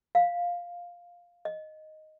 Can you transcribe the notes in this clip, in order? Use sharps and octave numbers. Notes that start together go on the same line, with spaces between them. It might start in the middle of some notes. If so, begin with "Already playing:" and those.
F5
D#5